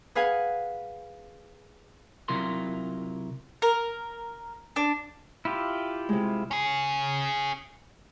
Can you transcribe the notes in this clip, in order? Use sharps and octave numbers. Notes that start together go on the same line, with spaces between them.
G#4 B4 F5 F#5 G#5
C3 F#3 E4 F4 A#4 C6
A#4
D4
E4 F4 G4
C3 G#3
C#4 G#4